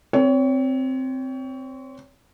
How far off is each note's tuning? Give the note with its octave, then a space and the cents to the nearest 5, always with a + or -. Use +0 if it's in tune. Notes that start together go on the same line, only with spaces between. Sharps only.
C4 +0 C#5 +25